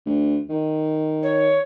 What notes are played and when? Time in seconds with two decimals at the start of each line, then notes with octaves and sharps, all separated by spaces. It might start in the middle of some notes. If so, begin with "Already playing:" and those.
0.06 D2
0.49 D#3
1.22 C#5